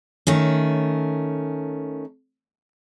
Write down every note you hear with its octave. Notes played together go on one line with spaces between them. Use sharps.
D#3 A3 C#4